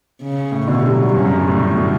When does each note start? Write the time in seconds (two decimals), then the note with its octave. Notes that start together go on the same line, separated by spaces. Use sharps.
0.22 C#3
0.52 A2
0.67 B2 D3
0.79 G3
0.91 F#3
1.02 G2
1.14 F#2 C#3
1.25 F#2
1.37 G2
1.48 A2
1.60 A2 D3
1.75 B2